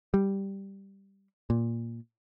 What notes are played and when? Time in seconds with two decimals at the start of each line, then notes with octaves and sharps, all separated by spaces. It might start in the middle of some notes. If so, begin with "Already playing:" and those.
0.14 G3
1.50 A#2